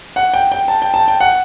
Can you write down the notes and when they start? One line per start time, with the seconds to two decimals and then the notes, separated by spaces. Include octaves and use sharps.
0.16 F#5
0.34 G5
0.52 G5
0.68 A5
0.82 G5
0.94 A5
1.08 G5
1.20 F#5